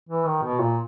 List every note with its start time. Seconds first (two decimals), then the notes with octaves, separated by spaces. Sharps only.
0.09 E3
0.26 D#3
0.43 B2
0.60 A#2